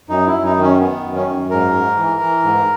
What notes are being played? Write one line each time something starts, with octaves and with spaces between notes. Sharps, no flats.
F#2 D#4
E4
F#2
D#4
D#3
C#4
D#3 B3
F#2
C#4
F#2
G#2 A#4
G#2
E3
E3
G#2